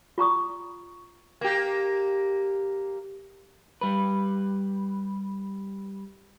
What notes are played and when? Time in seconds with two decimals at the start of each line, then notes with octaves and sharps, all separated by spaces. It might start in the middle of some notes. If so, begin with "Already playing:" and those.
0.18 F4 A#5 C#6 D#6
1.41 A#3 G4
3.81 G3 B4